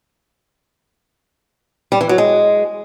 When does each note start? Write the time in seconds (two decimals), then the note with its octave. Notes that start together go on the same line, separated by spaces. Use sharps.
1.92 G3
2.01 E3
2.09 F#3
2.18 G#3